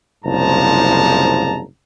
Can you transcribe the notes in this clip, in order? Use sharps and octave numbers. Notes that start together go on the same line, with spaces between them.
F#1 C2 G#2 F3 A5 A#5